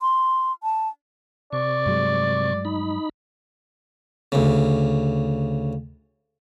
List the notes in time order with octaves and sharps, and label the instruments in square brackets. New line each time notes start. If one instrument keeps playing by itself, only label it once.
[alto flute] C6
A5
[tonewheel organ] C3 C#6 [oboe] D5
[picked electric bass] G2 F#3 G#3
[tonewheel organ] D#4 B5
[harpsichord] D2 C#3